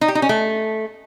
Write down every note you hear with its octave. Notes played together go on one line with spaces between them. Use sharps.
D#4
G4
D#4
C#4
A3